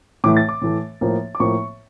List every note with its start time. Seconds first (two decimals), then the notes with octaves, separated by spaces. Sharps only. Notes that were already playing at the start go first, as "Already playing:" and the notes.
0.24 A2 E3 A3 D6
0.37 A6
0.49 D6
0.62 A2 E3 A3
1.01 A2 F3 A#3
1.35 D6
1.40 A2 F3 A#3 C#6